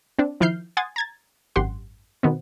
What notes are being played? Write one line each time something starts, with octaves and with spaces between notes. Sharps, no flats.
C4 D4
D#3 F3 E4 F6 G6 C7
F#5 G#5 C6 D#6 G#6 A6
A#5 G#6 A6
G#1 F#2 G4 F#5 C6
B2 D#3 B3 C4